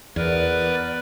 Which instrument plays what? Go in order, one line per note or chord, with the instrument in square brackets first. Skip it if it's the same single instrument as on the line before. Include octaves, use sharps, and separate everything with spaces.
[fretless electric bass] E2 [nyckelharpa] B3 F#5 [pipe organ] A#4 B4 [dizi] D5